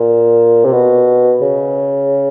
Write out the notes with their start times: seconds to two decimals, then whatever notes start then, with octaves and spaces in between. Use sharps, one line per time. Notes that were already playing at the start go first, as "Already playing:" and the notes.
Already playing: A#2
0.65 C3
0.73 B2
1.42 C#3